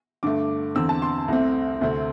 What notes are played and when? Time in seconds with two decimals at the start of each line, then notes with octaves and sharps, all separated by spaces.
0.23 G2 D3 A3 D6
0.75 E2 D3 C4 E6
0.89 A5
1.02 C6
1.28 C2 C3 A3 C4
1.81 D2 C3 A3 C4